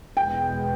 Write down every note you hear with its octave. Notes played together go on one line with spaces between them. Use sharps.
E2 B2 G#3 B3 G5